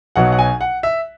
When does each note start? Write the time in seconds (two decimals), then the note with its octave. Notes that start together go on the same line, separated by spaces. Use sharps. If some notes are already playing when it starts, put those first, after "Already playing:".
0.16 B1 B2 F#3 F#5
0.32 F#5
0.38 G#5
0.61 F#5
0.83 E5